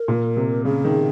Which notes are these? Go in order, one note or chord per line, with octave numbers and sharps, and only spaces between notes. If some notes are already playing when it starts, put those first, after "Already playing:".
Already playing: A#4
A#2
C3
C#3 G#4
D#3